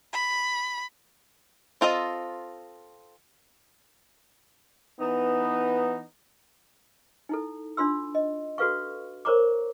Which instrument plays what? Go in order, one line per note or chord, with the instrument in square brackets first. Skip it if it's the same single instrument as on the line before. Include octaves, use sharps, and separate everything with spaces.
[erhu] B5
[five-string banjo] C4 F4 A4 D#5
[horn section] E3 B3 D#4
[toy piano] D#4 E4 A4
D4 F4 C6 E6
D#5
F#4 A4 B4 F5 C#6
A#4 C5 C#5 A#5 C#6 D6